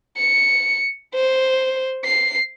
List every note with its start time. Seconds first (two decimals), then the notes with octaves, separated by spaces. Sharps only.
0.17 C#7
1.15 C5
2.04 C7